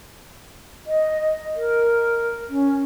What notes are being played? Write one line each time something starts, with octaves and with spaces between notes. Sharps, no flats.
D#5
A#4
C#4